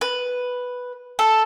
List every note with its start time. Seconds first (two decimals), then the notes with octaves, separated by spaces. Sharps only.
0.01 B4
1.19 A4